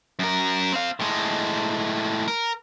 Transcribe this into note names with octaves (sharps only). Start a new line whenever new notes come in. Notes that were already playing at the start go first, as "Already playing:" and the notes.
F#2 A#4
C4 F5
A2 G#3
A#4